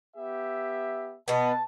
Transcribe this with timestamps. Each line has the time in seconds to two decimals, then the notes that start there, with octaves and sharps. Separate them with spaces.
0.16 B3 G4 E5
1.28 B2 B3 A5